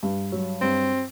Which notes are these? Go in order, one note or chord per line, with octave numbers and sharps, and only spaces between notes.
G2
F#3
G2 C4